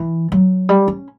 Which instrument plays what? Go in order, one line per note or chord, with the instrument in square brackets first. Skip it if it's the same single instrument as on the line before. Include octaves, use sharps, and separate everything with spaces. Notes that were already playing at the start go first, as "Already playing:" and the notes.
Already playing: [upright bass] E3
F#3
G3
C#4